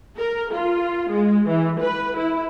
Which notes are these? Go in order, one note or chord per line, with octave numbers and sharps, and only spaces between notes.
A#4
F4
G#3
E3
B4
E4